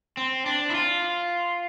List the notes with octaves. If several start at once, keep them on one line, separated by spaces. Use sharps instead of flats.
C4
D4
E4
F4